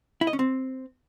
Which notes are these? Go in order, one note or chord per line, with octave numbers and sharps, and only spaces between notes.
E4
D#5
C#4
C4